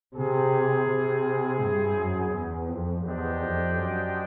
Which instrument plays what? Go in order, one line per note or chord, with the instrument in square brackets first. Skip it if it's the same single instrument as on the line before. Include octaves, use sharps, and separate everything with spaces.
[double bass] C3 [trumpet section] C4 E4 G#4
[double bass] C3
G2
F#2
E2
F2
[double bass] E2 [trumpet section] D4 G4 C5 D#5 G5
[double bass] F2
F#2